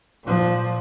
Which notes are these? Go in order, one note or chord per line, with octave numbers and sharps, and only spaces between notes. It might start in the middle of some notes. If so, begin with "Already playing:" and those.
A#2 F3